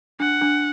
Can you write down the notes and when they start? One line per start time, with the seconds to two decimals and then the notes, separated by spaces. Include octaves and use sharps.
0.20 D4 F#5
0.41 D4